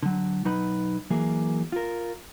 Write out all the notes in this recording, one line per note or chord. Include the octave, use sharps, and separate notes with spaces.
D3 F#3
B1 F#3 D#4 B4 B5
E3 F#3 A#3 G#4
F4 A#4